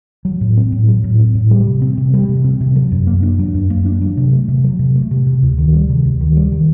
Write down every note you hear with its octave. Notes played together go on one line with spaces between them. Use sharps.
F#3
A2
C4
A2
F#3
A2
C4
A2
G3
C3
C4
C3
G3
C3
C4
C3
F#3
F#2
A#3
D4
F#3
F#2
A#3
D4
F#3
C3
A3
C3
F#3
C3
A3
C3
C3
D2
D#3
G3
C3
D2
D#3
G3
D#3